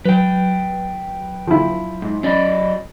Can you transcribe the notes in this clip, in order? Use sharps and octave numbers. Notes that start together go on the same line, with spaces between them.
F#3 B4 G5
F3 E4
G#2
F#3 C#4 D5 D#5 B5